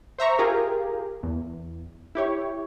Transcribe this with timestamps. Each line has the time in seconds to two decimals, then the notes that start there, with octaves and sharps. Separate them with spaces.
0.18 C5 E5 A#5 C#6
0.39 F4 G4 G#4 A#4
1.23 E2
2.15 E4 G4 C#5